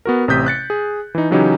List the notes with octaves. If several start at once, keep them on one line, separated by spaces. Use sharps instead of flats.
B3 F#4 A#4
A1 C3 D#6 G6 B6
F#6 A6 C#7
G#4
E3 D#4
C#3 E3 F#3 C#4 D#4 G4